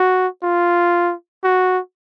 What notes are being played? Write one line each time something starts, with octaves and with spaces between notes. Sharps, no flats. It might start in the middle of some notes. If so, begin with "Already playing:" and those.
Already playing: F#4
F4
F#4